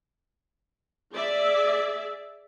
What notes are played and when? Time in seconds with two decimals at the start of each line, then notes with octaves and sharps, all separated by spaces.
1.13 G#4 D5 E5